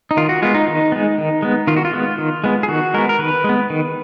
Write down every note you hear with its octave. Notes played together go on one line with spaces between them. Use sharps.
D#4
D#3 F4
F#4
G#3 B3 F4
D#4
D#3
G#3 B3
D#3
G#3 B3
D#3 F4
F#4
F4
G#3 B3
D#3
G#3 B3
G#4
D#3 F#4
G#3 B3 A#4
A#4
D#3 B4
G#3
B3
D#3